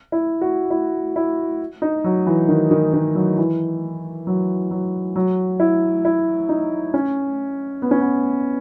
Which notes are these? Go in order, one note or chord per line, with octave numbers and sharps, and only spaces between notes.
E4
F#4
E4
E4
D#4
F#3
E3
D#3
D#3
D#3
F#3
E3
F#3
F#3
F#3
E4
E4
D#4
C#4
B3
C#4
B3